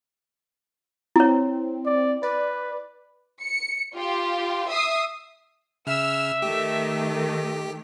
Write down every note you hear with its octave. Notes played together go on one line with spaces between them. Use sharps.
C4 E4 C#5
D5
B4 D5
C#7
F4 G4
E5 D#6 C7
C#3 E5 E6 F6
D#3 A3 G4